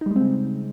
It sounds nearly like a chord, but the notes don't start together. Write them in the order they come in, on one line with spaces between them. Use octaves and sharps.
D#4 G3 G#3 C4 C#3